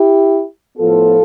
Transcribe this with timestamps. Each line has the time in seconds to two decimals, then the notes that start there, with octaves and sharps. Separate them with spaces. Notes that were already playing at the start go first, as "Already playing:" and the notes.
Already playing: E4 G4
0.77 A2 F3 B3 F4 A4